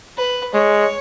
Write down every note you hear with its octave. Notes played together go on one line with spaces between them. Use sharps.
B4
G#3 C#5